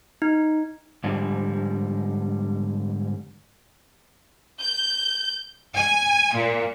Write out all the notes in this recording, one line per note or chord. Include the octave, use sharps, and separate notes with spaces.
D#4
G#2 D3 F3 G3
G6
G#5
A#2